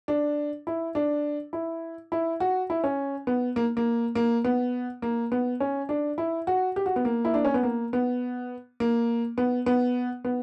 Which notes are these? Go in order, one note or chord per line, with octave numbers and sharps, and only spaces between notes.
D4
E4
D4
E4
E4
F#4
E4
C#4
B3
A#3
A#3
A#3
B3
A#3
B3
C#4
D4
E4
F#4
G4
F#4
B3
A#3
E4
D4
C#4
B3
A#3
B3
A#3
B3
B3
B3